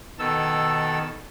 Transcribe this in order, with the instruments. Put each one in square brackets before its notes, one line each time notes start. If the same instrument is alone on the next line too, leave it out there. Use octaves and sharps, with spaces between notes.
[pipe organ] B2 D#3 A4 E6